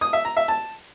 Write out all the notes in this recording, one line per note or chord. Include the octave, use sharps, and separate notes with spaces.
D#6
E5
A#5
E5
A5